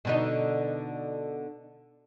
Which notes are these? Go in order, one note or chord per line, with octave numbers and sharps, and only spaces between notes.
B2 D3 D#4